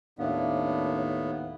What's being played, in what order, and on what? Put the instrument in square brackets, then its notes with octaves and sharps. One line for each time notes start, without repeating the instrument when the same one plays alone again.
[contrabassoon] D#2 [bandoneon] A2 B3 [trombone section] A#3 C#4 D4 [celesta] E5 F5